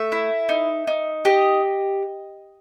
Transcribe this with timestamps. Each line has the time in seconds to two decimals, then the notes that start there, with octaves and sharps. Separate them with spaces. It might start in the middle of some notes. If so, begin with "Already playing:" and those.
Already playing: A3 E5
0.12 E4
0.49 D#4
0.87 D#4
1.25 G4 D#5